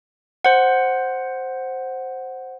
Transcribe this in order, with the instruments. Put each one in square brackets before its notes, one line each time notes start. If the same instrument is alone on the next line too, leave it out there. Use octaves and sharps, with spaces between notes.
[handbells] C5 F#5